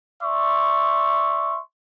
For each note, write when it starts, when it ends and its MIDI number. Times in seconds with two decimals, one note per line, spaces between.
0.22 1.60 74
0.22 1.60 76
0.22 1.60 84
0.22 1.60 85